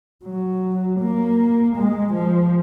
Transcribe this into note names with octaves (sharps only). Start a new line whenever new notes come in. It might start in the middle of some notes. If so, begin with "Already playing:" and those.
F#3
A#3
G#3
F3